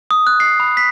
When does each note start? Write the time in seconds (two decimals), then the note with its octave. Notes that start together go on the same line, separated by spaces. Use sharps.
0.11 D#6
0.27 F#6
0.40 C7
0.60 B5
0.77 B6